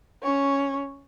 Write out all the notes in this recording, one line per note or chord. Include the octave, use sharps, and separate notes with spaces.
C#4 C#5